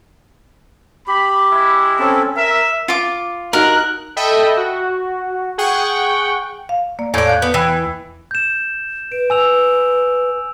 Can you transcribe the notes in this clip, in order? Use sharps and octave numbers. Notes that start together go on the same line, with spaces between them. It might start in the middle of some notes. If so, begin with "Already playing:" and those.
G4 B5
G#3 E4
C4 C#4 A4
A#4 E5
F4 D6
D#4 F#4 A#4 F#6
A4 D#5 E5 G5 B5
F#4
G#4 F#5 G5 C#6
F5
A#3 D5
E2 A2 D5
F5 F#6 G6
B3
E3 G5 B5 F#6
G6 E7
B4 D7
G#5 E6 F7